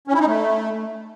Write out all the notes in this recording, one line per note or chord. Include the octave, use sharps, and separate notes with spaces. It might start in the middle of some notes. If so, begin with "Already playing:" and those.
C#4
E4
D#4
A3